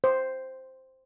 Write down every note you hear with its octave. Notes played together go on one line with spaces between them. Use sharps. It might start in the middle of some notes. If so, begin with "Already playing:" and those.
C5